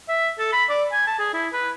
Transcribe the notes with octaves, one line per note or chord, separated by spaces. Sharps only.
E5
A4
B5
D5
G#5
A5
G#4
E4
B4